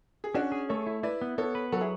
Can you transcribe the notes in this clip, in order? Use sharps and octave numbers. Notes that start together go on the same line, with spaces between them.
G#4
C#4 D4 F#4
G#4
A3 A4 C#5
E4
E4 B4 D5
B3
B3 A4 C#5
B4
F#3 F#4 A4
E4 G#4